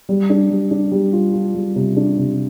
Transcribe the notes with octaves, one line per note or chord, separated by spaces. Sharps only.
G3
D4
G3
D4
G3
F4
F4
G3
C3
D4
C3